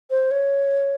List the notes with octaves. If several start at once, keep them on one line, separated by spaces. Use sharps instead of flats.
C5
C#5